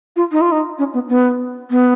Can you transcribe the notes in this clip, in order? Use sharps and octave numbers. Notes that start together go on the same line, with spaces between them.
F4
D#4
F4
D#4
C#4
B3
B3
B3